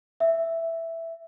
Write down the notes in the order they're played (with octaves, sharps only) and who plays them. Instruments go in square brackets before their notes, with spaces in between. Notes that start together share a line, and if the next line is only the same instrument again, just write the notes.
[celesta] E5